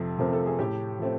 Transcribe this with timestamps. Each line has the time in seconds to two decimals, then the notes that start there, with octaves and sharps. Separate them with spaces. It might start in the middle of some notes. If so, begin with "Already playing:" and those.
Already playing: F2 C3 F3 A3
0.18 C3 F3 A3 C4 A#4
0.33 A4
0.46 G#4
0.59 A2 G4
0.99 F3 A3 C4